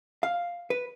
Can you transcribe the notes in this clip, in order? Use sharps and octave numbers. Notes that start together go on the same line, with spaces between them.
F5
B4